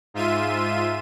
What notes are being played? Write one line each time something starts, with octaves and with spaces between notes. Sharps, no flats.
G#2 F4 E5 D#7